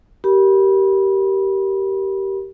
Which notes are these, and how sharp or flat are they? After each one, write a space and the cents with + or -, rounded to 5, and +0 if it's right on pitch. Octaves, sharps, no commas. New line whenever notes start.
G4 -20 A#4 +0 B5 -20